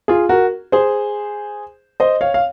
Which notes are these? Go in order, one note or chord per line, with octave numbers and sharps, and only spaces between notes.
F4 G#4
F#4 A#4
G#4 C5
C5 D#5
C#5 F5
F5